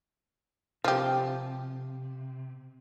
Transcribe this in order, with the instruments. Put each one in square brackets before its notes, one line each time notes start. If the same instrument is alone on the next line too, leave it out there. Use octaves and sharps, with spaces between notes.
[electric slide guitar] C3 [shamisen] F3 G4